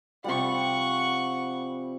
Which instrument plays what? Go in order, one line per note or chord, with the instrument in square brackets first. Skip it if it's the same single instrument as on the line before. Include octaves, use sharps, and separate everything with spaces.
[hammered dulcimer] C3 F3 G3 [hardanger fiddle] F#5 C#6